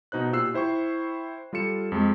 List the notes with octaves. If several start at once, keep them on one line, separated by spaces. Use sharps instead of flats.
B2 D#4 C5 F#6
A#2 F4 G4 E6 F#6 C7
E4 C5 G5 C#6
G3 F4 A4 C#7 E7
F2 G#3